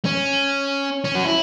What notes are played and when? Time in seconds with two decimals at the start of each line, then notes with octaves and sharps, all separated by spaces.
0.05 C#4
1.04 C#4
1.15 F#4
1.24 E4